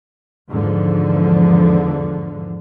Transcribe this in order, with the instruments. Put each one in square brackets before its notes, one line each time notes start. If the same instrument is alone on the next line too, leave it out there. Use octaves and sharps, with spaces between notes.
[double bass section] E2 G#2 D3 F3